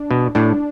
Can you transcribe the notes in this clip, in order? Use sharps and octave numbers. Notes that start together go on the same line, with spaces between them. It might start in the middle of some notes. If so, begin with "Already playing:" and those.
Already playing: D4
B2
A2 D4